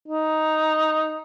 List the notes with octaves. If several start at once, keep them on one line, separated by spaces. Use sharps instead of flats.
D#4